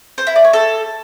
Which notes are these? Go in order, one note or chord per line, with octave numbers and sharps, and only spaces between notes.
C5
E4
D5
C#5
A4